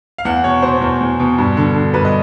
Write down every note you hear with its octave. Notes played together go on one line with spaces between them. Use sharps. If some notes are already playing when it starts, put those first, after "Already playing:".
F5
E2 F#5
B2 C#5
B2 C5
E2
E2
B2
G2
D3
D3
G2 B4
D#5